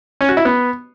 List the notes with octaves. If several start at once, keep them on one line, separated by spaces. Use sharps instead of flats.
C#4
F#4
E4
B3